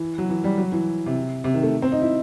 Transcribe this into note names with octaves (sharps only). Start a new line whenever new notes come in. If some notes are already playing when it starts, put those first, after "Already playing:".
Already playing: E3
F#3
E3
G3
F#3
E3
C3
C3
D#3
A3
C4
D#4
E4